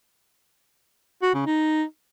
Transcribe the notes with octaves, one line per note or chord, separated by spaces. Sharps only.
F#4
C#3
D#4